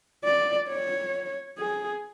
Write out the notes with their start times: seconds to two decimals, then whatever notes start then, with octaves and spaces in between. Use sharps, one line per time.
0.25 D5
0.69 C#5
1.58 G#4